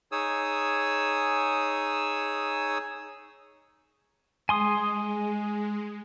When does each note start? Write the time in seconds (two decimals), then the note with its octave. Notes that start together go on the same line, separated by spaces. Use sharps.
0.12 D#4 G#4 C#5 D#6 E6
4.49 G#3 G#5 C6 D#6